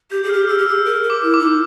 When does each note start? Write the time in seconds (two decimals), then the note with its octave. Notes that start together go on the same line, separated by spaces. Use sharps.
0.11 G4 G6
0.23 G#4
0.29 F6
0.33 G4
0.41 F6
0.48 G#4 E6
0.58 G4
0.66 G#4 E6
0.85 A#4
1.03 A#4
1.10 D6
1.22 E4
1.34 D6
1.40 D#4